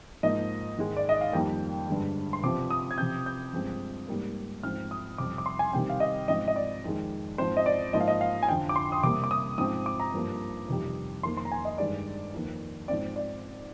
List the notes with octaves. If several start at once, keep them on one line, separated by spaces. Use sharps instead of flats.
G#2 F3 A#3 D#5
G#2 D#3 G#3
D5
D#5
F5
F2 D#3 G3 A#3 G5
G2 D3 G#3
C6
C3 F3 C4 D6
D#6
G#6
C3 F3 C4 G6
G6
G2 F3 G#3 C4
G#2 G3 A#3
G#2 F3 C4 F6
D#6
F2 C3 G3 C4 D6
D6
C6
G#5
C3 D#3 G3 C4 G5
F5
D#5
G#2 F3 C4 D#5
D#5
D5
F2 D#3 G#3
G#2 F3 C4 C5
D#5
D5
G#2 F3 A#3 D#5
F5
D#5
F5
G#5
F2 D3 F3 G5
D6
C6
D#6
C3 G3 A#3 D6
D6
D#6
G#2 F3 C4 D#6
D6
A#5
G2 F3 A#3
F2 C3 D#3 G3
F2 D#3 A#3 C6
C6
A#5
G#5
D#5
G2 D#3 G#3 D5
F2 D#3 A#3
G#2 F3 C4 D5
D5